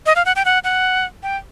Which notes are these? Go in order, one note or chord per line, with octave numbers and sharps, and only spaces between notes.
D#5
F5
F#5
G5
F#5
F#5
G5